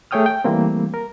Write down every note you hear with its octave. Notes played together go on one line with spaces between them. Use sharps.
A3 G#4 C#5 G5 D#6 F6
G5
E3 G3 A3 A#3 C4
A#4